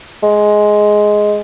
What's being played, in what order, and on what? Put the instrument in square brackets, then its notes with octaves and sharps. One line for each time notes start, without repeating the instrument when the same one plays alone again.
[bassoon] G#3